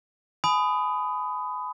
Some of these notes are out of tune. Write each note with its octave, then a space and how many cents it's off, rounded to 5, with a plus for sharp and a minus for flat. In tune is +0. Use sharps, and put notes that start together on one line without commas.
G#5 +30 B5 +25 D#6 +0